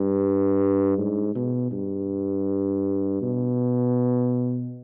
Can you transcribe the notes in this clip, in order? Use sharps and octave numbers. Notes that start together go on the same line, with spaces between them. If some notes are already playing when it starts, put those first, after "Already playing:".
Already playing: G2
G#2
B2
G2
B2